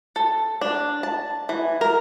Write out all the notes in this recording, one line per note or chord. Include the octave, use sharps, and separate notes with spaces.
A4
D4
A5
E3
A#4